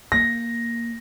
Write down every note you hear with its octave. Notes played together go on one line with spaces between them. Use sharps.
A#3 A#6